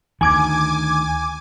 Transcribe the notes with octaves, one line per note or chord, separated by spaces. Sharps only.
D2 D#3 G#5 D6 G#6